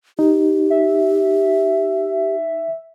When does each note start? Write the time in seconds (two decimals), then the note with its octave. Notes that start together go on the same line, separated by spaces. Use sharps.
0.19 D#4 G4
0.70 E5